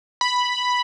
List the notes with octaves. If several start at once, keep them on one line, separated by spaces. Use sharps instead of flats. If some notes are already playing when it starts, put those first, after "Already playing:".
B5